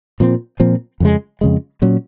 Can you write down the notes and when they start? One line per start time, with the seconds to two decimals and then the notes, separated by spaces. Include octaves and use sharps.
0.20 A#2 F3 C4
0.60 A#2 F3 C4
1.00 F2 C#3 G#3
1.41 F2 C#3 G#3
1.82 A#2 F#3 C#4